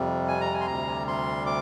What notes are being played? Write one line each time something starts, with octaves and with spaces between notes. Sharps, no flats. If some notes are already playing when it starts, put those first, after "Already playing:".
Already playing: F2 C3 G3
G#5
A#5
G#5
C6
D2 C3 G3 A#5
C6
D6